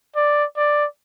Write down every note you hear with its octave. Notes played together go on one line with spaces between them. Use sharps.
D5
D5